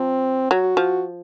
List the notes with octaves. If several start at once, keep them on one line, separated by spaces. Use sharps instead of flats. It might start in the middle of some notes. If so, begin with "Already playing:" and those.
Already playing: F3 C4
F#3 F#4
F3